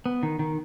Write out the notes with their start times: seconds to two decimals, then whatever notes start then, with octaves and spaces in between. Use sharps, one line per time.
0.06 B3
0.23 D#3
0.39 D#3